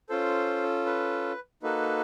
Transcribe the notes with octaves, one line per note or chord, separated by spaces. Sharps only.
C#4 F4 A4 C5
B4
A#3 D#4 F#4 A4 B4